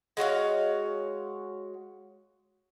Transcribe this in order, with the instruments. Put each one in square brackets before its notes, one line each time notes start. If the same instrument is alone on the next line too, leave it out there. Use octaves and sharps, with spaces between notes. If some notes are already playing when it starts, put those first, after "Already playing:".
[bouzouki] G#3 F#4 C#5 F5